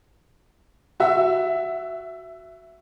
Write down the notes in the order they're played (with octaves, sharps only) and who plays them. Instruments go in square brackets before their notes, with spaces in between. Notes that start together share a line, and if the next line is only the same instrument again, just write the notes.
[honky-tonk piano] F#4 E5